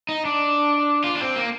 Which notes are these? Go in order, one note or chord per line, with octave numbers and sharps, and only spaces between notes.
D#4
D4
F4
D4
C4
A#3